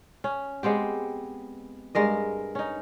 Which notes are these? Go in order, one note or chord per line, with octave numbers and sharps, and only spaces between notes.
C#4
G#3 B3 C4 G4
G2 G#3 A#4 D#5
C#4 D#4